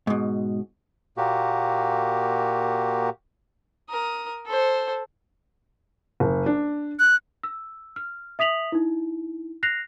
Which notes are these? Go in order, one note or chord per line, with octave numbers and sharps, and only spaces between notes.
G#2 B2
A#2 A#3 F#4 G4
A#4 D#6
A4 C5
F#1
D4
F#6
E6
F6
E5 D#6 B6 F7 F#7
D#4 E4
F#6 A#6 C7 F7